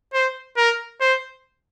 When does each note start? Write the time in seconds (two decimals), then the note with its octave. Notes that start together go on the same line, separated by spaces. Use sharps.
0.13 C5
0.57 A#4
1.01 C5